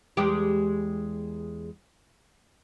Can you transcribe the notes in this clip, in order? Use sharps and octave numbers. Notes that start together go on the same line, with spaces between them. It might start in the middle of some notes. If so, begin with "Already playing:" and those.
E2 G#3 G4